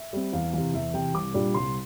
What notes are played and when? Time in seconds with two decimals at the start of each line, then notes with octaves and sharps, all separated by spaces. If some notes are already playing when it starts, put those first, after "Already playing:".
Already playing: E5
0.13 G3 C4
0.33 E2 F5
0.53 C3 E3 F5
0.74 E2 E5
0.93 C3 E3 G5
1.14 C2 D6
1.34 A#2 G3 D4
1.54 C2 C6